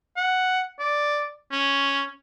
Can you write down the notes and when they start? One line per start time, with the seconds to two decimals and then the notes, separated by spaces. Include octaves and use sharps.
0.17 F#5
0.80 D5
1.52 C#4